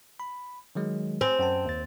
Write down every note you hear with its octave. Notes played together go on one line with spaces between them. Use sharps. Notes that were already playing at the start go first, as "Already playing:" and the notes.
B5
D#3 F#3 G#3
C4 G#5
F#2 G5 A5
D#2 A6